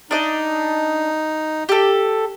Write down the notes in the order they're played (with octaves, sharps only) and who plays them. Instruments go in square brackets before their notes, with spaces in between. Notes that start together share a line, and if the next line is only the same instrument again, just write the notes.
[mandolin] D4 D#5 [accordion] D#4
[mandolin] G4 A4